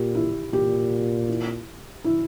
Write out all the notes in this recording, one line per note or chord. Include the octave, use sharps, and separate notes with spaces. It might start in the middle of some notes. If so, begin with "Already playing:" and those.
Already playing: A#2 G4
E4
A#2 G4
E4
E4